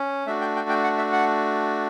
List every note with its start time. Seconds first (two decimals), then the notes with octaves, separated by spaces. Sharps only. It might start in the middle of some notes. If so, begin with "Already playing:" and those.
Already playing: C#4
0.26 A3 D4 F#4 E5
0.41 G5
0.56 G5
0.69 G5
0.84 F#5
0.98 E5
1.12 F#5